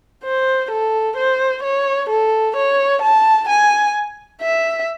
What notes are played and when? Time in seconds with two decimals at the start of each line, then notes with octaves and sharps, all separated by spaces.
0.24 C5
0.71 A4
1.16 C5
1.63 C#5
2.10 A4
2.56 C#5
3.02 A5
3.49 G#5
4.42 E5